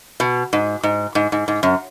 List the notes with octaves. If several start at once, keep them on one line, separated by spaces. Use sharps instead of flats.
B2
G#2
G#2
G#2
G#2
G#2
F#2